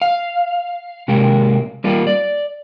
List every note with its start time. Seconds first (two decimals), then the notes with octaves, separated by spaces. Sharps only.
0.02 F5
1.08 C3 G#3 A#3 G4
1.84 G3 A#3 F4
2.07 D5